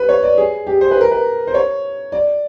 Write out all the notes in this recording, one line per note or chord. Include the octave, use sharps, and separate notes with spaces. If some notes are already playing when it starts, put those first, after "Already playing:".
Already playing: B4
C#5
D5
G#4
G4
C5
B4
A#4
B4
C5
C#5
D5